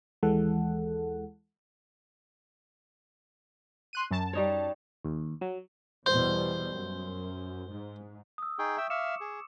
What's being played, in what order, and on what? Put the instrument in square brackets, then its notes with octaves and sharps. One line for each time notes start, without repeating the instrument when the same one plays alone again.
[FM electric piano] D#2 E3 G#3 A4 F#5
[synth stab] C6 F#6 D#7
F#2 A5
[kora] G3 D#4 C#5
[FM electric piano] D#2
F#3
[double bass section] E2 B2 G3 [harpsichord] C5
[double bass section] F#2
G#2
[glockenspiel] D#6 E6
[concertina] D#4 G#4 G5 [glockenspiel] C#6
[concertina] E5 G5
[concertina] E5 F5 [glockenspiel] D6 C#7 E7
[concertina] G#4